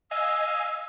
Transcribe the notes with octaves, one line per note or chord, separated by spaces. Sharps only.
D#5 F5 G#5 E6